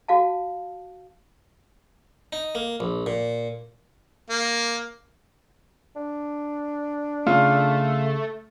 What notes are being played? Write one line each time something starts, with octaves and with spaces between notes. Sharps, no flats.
F#4 F5 A5
D#4
A#3
A#1
A#2
A#3
D4
C#3 A3 F4